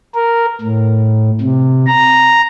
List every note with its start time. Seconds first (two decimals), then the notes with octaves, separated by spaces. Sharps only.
0.14 A#4
0.61 A2
1.41 C3
1.86 A#5